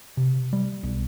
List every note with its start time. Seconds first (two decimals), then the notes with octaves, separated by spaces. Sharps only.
0.17 C3
0.53 G3
0.83 B1